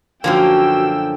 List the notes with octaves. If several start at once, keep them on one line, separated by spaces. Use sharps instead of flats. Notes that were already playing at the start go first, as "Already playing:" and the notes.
F#2 D3 F3 A#3 F#4 G5 E6